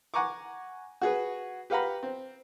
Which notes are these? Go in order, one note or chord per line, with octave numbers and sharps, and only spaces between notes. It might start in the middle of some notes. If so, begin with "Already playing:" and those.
F#5 G#5 A#5 C#6 D6
F#4 G#4 B4
G4 B4 F5 F#5 A#5 B5
C4